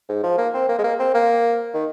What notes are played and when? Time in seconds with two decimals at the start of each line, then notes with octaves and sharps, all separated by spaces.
0.09 G#2
0.23 F3
0.38 A#3
0.54 C4
0.69 A#3
0.78 G#3
0.84 A#3
0.99 C4
1.14 A#3
1.74 D#3